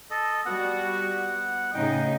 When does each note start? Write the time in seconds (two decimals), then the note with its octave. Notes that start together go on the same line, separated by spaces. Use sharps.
0.11 A4 D#5
0.45 G3 B3 F#4 F#5
1.74 A2 C#3 D#4 G5